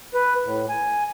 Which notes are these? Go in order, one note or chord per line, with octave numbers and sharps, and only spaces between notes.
B4
A2
G#5